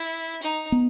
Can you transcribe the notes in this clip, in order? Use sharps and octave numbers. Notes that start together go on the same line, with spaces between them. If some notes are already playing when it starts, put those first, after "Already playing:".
Already playing: E4
D#4
B3